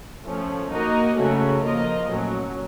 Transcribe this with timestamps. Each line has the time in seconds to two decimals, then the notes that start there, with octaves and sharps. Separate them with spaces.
0.25 F3 A3 C#4
0.71 A#3 D#4 F#4 A#4 D#5
1.16 C#3 F#3 A3 C#4 F#4
1.63 F3 A#3 F4 A#4 D#5
2.09 A#2 F#3 A3 C#4 F#4